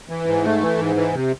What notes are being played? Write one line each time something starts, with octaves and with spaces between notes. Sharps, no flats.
E3
G#2
A3
E3
G#2
E3
C3